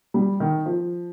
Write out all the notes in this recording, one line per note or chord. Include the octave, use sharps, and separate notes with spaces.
G3
D#3
F3